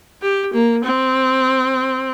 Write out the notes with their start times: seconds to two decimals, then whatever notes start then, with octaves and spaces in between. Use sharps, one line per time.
0.22 G4
0.54 A#3
0.84 C4